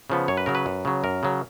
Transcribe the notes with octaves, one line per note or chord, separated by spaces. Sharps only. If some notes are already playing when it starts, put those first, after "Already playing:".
C#3 F3 B3
F#2 C#5
B4
C#3 F#3 A#4
B4
F#2
C#3 F#3
F#2 A#4
C#3 F#3